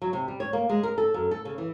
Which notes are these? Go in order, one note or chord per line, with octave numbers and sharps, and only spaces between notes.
F#3
C3
G3
C#5
A#3
G#3
A#4
A4
F#2
A4
C#3
E3